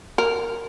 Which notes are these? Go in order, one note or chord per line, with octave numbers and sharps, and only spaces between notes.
A#4